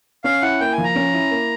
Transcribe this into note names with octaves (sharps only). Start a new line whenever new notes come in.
C#4 F5
E4 F#5
A#3 G5
G#5
F3
A#5
C#4
E4
A#3